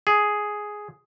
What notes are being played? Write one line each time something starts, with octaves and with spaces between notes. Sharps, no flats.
G#4